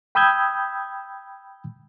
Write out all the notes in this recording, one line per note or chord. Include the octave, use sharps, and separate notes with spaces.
G5 B5 D#6 E6 G6 G#6